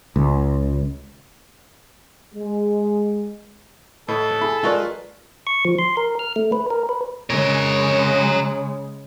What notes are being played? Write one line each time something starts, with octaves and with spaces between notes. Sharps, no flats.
C#2
G#3
A2 A4 B4 D#5
E4 G#4 B5
G#3 F4 A#4 B4 D5 C#6 G7
C#6
F3
C6
A#4
F6
A3
B4
A#4
B4
C#3 G#3 A#4 C#5